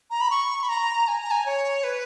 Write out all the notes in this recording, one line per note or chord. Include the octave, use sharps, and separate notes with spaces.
A#5
B5
C#6
B5
A#5
G#5
A#5
G#5
C#5
B4